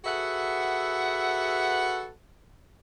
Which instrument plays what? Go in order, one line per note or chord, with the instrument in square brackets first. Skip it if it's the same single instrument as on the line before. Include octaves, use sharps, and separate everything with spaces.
[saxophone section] F#4 G#4 A4 B4 E5 F#5